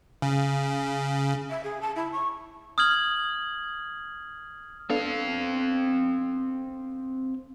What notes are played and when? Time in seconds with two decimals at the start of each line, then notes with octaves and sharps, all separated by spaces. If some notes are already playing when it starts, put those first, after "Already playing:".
0.22 C#3
1.50 E5
1.64 G#4
1.81 A5
1.96 E4
2.12 C#6
2.78 D#6 F6 G#6 F#7
4.90 B3 C4 D4 A4 F5